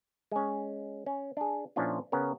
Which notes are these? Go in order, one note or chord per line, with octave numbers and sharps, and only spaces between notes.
G#3 C#4
C#4
D4 G#4
A#2 F3 C#4 D4 E4 F4
C#3 B3 C#4 A#4